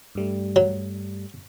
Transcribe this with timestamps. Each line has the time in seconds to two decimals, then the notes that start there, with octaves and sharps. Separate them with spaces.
0.15 G2 G3 A3
0.56 F#3